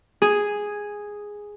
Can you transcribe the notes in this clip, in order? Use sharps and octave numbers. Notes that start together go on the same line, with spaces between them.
G#4